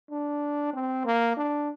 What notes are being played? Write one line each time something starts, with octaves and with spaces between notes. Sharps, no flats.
D4
C4
A#3
D4